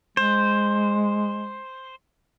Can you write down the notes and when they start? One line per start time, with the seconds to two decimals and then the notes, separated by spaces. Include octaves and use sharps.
0.17 G#3 C5